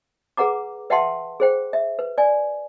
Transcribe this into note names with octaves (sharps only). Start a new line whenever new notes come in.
G#4 B4 F#5 A#5 D6
B4 E5 F#5 G5 A5 C6
G#4 C5 G5
E5
B4
D5 G#5